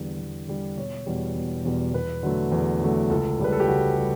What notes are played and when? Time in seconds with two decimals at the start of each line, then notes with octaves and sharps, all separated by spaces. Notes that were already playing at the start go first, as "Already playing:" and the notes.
Already playing: E2 D3 G3
0.19 E2
0.48 D3 G3
0.77 E1 C#5
1.06 E2 B2 G3
1.36 E1
1.65 E2 B2 G3
1.94 E2 B4
2.23 D3 F#3 A3
2.52 E2
2.81 D3 F#3 A3
3.10 C#2 A4
3.39 C#3 G3 B4
3.53 A4
3.60 G4
3.68 C#2 F#4
3.98 G3